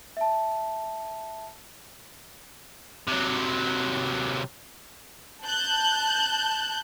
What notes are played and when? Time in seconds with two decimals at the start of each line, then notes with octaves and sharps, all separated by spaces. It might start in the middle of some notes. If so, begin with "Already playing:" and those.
0.17 E5 A5
3.08 C3 F#3
5.45 A5 F#6 G6